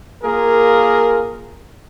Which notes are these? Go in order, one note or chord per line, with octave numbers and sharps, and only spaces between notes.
A#3 F4 G#4 A#4